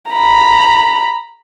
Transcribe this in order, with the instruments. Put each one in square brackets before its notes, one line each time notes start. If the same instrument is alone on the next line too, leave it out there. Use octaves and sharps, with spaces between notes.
[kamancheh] A#5 B5